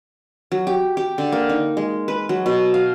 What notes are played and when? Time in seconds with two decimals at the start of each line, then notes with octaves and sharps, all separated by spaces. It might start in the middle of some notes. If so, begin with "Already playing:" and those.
0.52 F#3
0.67 G4
0.97 G4
1.18 D3
1.32 A#3
1.49 D#4
1.77 G#3
2.08 B4
2.29 F#3
2.46 B2
2.74 F5